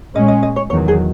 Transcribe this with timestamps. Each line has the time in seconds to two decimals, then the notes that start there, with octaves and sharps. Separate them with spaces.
0.15 A#2 G#3 C#4 D#5
0.28 D#5
0.43 D#5
0.56 C#5
0.70 E2 C#5
0.73 D#3 F#3
0.88 G#4